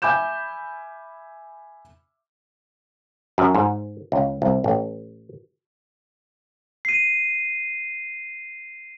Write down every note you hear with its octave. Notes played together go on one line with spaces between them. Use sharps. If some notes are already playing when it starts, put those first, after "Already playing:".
E5 G#5 B5 D6 G6 E7
F#2
G#2
C#2
C2
A1
C7 D#7